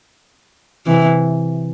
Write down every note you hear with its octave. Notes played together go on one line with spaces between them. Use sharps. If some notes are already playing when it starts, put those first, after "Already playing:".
C3 E3